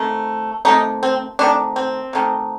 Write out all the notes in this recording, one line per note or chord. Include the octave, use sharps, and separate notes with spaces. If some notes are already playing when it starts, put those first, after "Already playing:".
Already playing: C3 D#3 A3
C3 D#3 A3 D#4
C4
C3 D#3 A3 D4
C4
C3 D#3 A3